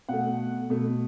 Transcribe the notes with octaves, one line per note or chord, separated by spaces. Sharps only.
B2 A3 F#5
B2 A3